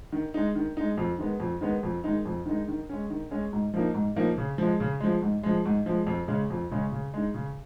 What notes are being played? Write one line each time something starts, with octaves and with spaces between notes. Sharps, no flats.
D#3
G#3 D#4
D#3
G#3 D#4
F2
D#3 G#3 B3
F2
D#3 G#3 B3
F2
D#3 G#3 D#4
F2
D#3 G#3 D#4
D#3
G#3 C#4
D#3
G#3 C#4
G#2
F3 A#3 D#4
G#2
F3 A#3 D#4
C#3
F3 G#3
C#3
F3 G#3
G#2
F3 G#3
G#2
F3 G#3
F2
C#3 G#3 C#4
F2
C#3 G#3 C#4
C#3
G#3 D#4
C#3